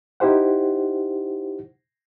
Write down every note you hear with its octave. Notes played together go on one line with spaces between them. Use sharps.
D#4 E4 G4 C5 F#5